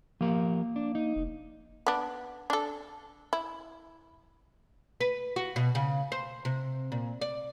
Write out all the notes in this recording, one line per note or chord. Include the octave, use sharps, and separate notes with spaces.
F3 A#3 G4 A#4
D4
D#4
F1
B3 D4
D4 A4
E4
B4
F#4
B2
C#3
C5
C3
A#2
D5